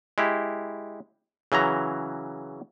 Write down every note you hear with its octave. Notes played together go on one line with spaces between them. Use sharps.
G#3 E4 G4
C#3 E3 F#3 A#5